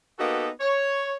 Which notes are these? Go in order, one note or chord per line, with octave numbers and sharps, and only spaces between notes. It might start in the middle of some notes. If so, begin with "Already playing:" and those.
A#3 B3 D#4 F#4 G4 A4
C#5